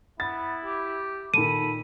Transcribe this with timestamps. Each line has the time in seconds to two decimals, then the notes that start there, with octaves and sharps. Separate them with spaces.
0.20 B3 E4 A6
0.65 G4
1.34 A#2 D#3 A4 B5 D#7